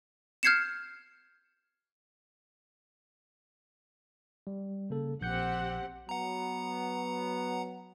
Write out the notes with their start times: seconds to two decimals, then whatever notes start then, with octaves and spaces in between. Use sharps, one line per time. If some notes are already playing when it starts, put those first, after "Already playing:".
0.43 F6 G6 G#6 C7 C#7 E7
4.47 G3
4.90 C#3 A#3 A4
5.21 A#1 C4 G4 F#5 G6 C#7
6.09 F#3 B3 F#5 A#5